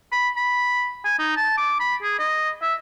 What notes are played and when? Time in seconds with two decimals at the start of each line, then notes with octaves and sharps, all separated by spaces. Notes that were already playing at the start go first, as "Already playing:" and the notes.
0.12 B5
0.37 B5
1.05 G#5
1.19 D#4
1.37 A5
1.57 D6
1.80 B5
2.03 G#4
2.19 D#5
2.62 E5